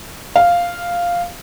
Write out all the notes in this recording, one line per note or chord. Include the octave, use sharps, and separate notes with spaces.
F5